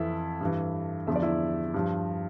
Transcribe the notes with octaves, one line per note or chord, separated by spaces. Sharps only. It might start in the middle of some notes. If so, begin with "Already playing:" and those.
Already playing: F2 E3 E4 E5
G2 E3
E2 D3 F3 E5
D5
E4 E5
G2 F3